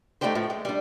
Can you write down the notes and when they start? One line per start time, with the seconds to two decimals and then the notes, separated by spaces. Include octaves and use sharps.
0.21 A3 C4 D4 D#4 G4 C5
0.35 A2 F3
0.50 G#3
0.65 G3 D4